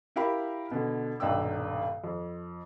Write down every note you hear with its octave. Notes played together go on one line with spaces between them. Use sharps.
E4 G4 A#4 F5 B5
B2 D3
D#1 B1 G2 D5 G5 E6
F2